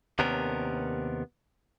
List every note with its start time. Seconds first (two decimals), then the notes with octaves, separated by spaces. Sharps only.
0.19 D#2 C3 B3 C#4 D4 A#4